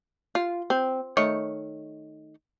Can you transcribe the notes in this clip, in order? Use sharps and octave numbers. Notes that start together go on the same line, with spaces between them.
F4
C4
D#3 A3 C#5